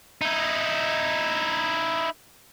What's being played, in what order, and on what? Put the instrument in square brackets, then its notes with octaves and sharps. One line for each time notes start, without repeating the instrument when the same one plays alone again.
[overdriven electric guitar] D#4 E4